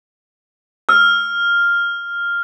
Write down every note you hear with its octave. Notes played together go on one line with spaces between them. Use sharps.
E6 F6